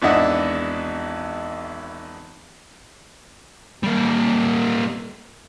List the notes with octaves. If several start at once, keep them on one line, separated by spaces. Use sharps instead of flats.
G#1 E2 D4 E4 D#5 F#5
G3 A#3